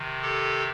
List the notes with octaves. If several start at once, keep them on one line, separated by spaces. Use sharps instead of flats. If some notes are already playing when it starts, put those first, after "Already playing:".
Already playing: C3 D#3
G4 A4